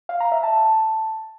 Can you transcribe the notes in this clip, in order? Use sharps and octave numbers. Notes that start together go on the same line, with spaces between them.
F5
A#5
E5
A5